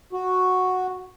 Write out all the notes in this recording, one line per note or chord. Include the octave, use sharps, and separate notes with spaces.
F#4